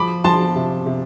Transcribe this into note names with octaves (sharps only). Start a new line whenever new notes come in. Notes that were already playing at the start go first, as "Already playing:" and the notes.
Already playing: F3 B5 D6
F3 A5 C6
C3
C3